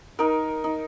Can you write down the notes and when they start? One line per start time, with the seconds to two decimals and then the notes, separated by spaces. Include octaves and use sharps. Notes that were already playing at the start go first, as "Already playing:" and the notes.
0.19 D#4 A#4
0.64 D#4